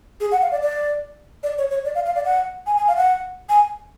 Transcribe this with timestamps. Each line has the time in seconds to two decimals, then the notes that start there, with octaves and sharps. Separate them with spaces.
0.20 G#4
0.32 F#5
0.42 F5
0.51 D5
0.62 D5
1.43 D5
1.58 C#5
1.71 C#5
1.85 D5
1.95 F5
2.06 F5
2.16 D5
2.25 F#5
2.66 G#5
2.77 G#5
2.88 F5
2.97 F#5
3.49 G#5